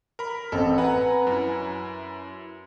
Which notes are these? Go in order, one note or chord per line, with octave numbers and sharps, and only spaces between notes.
A#4 B5
A1 C4 A4
B4 F#5 G#5 A#5
F#2 E4